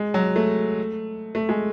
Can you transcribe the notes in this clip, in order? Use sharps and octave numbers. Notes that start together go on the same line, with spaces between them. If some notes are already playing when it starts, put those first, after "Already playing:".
Already playing: G#3
F#3
A3
A3
G#3